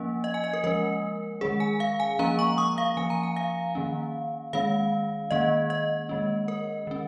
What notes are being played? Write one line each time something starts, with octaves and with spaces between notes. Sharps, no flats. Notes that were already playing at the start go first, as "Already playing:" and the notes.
Already playing: F3 A#3 C#4
D#5
G#5
D#5
A#4
F3 G#3 C#4 A#4
D#3 G#3 C#4 G#4
G#5
F5
G#5
F3 A#3 C#4 A#5
C#6
D#6
F5
F3 C#4 G#5
A#5
G#5
F5
D#3 A#3 C#4
D#3 G#3 C#4 F5
D#3 A#3 C#4 D#5
D#5
D#3 G#3 C#4
A#4
D#3 C#4